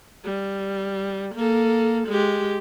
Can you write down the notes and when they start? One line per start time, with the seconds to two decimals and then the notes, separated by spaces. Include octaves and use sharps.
0.25 G3
1.35 A#3 A4
2.08 G#3 G4